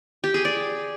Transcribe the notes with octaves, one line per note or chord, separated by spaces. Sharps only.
G4
G#4
D5